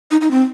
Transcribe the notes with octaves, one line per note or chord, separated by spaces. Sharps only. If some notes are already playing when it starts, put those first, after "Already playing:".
D#4
D#4
C4